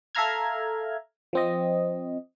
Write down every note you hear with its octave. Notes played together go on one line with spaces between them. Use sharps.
A4 E5 F5 A#5 F6 G#6
F3 C4 D#5